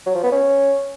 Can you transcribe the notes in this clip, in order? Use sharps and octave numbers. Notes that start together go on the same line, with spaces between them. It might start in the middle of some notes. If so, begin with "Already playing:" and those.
F#3
F3
B3
C#4